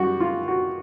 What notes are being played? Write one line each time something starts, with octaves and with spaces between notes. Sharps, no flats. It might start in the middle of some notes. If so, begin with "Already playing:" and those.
Already playing: F#2 G3 F#4
F4
F#4